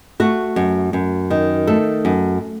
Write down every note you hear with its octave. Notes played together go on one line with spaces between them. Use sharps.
A3 F#4
F#2
F#2
D#3
A3 A4
F#2